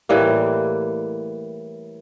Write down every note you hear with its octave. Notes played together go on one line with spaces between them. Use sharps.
A2 E3 G3 A#3